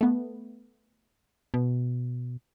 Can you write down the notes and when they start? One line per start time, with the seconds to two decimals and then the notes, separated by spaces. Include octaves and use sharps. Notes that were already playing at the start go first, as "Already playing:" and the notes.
0.01 A3 B3
1.54 B2